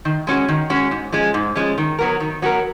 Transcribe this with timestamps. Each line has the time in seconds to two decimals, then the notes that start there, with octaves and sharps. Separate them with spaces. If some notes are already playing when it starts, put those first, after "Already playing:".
0.05 D#3
0.27 G#3 C#4 F#4
0.49 D#3
0.70 G#3 C#4 F#4
0.91 G#2
1.12 F3 G#3 C#4
1.34 G#2
1.56 F3 G#3 C#4
1.78 D#3
1.99 F#3 B3 F#4 A#4
2.20 D#3
2.42 F#3 B3 F#4 A#4